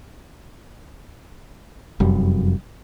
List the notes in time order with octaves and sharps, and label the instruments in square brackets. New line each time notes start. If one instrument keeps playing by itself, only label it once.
[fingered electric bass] F1 F#2 G3